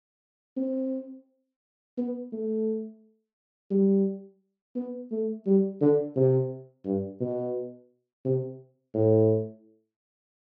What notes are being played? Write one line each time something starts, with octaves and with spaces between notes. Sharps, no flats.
C4
B3
A3
G3
B3
A3
G3
D3
C3
G2
B2
C3
A2